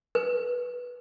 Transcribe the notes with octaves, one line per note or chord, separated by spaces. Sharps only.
B4